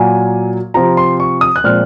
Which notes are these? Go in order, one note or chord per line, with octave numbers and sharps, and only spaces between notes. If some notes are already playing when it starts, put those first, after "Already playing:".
Already playing: A#2 F#3 A#3 G#5
C3 F3 C4 F4 A#5
C6
C#6
D#6
F#6
A#2 F3 G#3 C4 F6